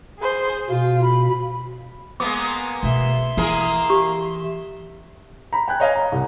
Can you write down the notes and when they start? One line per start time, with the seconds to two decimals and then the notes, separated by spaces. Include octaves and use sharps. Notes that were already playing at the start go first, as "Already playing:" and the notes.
0.19 G#4 C5
0.70 B2 F4
1.04 B5
2.20 G#3 A#3 B3 D6
2.83 B2 A3 E5 C6
3.37 E3 A#3 G#4 A#4
3.90 G4
5.53 A#5 B5
5.68 G5 G#5 F#6
5.80 C#5 D#5 F5 G#5
5.96 A#5
6.12 C2